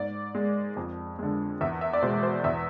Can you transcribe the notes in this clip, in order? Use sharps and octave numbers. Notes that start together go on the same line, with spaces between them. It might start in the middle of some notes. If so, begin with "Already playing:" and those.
Already playing: G#2 D5
G#3
F2
D3 G#3
E2 E5
E5
D5
B2 G#3 C5
C5
E2 E5